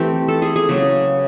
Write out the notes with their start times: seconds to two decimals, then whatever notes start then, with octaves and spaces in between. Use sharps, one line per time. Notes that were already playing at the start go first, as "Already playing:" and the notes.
Already playing: E3 A3 C4 G4
0.28 A4
0.42 G#4
0.56 G#4
0.69 C#3 F#3 A#3 C#4